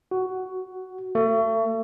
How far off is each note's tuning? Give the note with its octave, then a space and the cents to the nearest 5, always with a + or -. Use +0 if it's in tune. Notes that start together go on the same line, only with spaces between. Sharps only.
F#4 +10
A3 +35